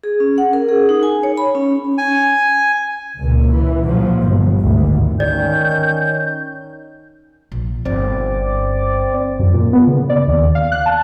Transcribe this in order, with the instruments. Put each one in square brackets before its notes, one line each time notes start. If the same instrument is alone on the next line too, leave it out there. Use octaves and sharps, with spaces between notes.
[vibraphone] G#4
C#4
F#5
A#4
G#4
D#4
G#5
C#5
B5
C#4
[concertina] G#5
[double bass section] C#2 A#2
E3
A#1 G#2 F3 F#3
G1
G#1 D2
[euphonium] D#3 [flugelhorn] C#4 [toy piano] D5 [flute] G6
[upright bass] A#1
[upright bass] G1 F4 [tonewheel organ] C4 D5
[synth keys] F#2
A#2
B3
C#3
D5
D#2
F5
F#6
A5